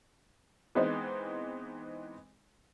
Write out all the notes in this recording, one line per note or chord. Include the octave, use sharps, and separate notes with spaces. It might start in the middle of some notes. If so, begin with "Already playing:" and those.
E3 G#3 B3 C4 D#4 C5